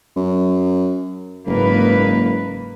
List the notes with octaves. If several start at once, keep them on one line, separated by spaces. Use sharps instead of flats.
F#2
F#1 G#2 A#3 B4